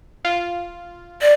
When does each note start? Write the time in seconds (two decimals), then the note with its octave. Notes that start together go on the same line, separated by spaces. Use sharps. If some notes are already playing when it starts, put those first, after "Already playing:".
0.25 F4
1.21 D5